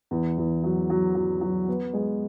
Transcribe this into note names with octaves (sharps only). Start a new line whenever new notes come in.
E2
E2
F#3
F#3
F#3
F#3
B3
G#3